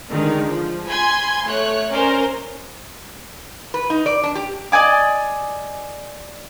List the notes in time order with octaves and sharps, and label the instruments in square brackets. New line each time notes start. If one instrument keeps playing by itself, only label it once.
[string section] D3 D#3 G#3
F3
G#5 B5 C6 G#6
A3 C#5 F#6
C#4 A#4 C5 D5
[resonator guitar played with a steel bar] B4
D#4
D5
D4
G4
[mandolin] D5 D#5 G#5 D6